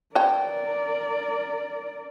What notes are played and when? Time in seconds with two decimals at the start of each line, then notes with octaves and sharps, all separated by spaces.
0.15 A#4 B4 C#5 D5 G5